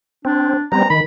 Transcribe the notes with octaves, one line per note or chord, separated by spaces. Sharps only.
C4 D4
G3 B3 C4 A#5
D#3 B5